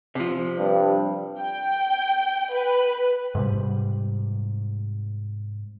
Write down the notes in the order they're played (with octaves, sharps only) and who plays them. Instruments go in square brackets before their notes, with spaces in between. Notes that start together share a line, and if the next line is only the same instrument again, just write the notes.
[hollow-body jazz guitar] C3 F3
[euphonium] G2
[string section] G5
B4
[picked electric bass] G#2 C3 G3